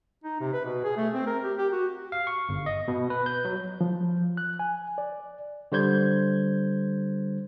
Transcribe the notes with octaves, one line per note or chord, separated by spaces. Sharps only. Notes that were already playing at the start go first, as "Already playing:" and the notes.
D#4
C3
B4
B2
G#4
A3
C4
A#4
G4
G4
F#4
F5
C#6
G1
D#5
B2
B4
G6
F#3
F3
F#6
G#5
D5
D3 G3 C5 G6 G#6